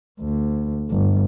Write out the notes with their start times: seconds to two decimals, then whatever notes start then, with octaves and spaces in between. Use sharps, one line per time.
0.21 D2
0.91 G1